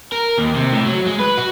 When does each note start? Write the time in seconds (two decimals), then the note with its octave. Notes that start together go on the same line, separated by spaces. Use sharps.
0.12 A#4
0.38 D#2
0.55 C3
0.73 A2
0.86 F#3
1.06 G#3
1.20 B4
1.38 F#4